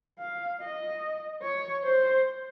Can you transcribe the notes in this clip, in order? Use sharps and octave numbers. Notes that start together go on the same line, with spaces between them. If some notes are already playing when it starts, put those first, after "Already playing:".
F5
D#5
C#5
C5